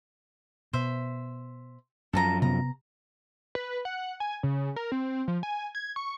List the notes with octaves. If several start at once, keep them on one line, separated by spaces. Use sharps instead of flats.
B2 C5 E5
F#2 F3 A4 A5 A#5
C3 B3 A#5
B4
F#5
G#5
C#3
A#4
C4
F3
G#5
G#6
C#6